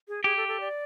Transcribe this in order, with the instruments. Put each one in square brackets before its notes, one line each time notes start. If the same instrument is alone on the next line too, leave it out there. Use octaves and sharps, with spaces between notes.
[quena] G#4
[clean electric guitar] G4 [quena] G#4
[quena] A4
A4
D5